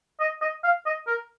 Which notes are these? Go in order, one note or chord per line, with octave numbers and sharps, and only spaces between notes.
D#5
D#5
F5
D#5
A#4